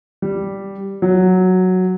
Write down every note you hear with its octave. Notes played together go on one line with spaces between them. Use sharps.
G3
F#3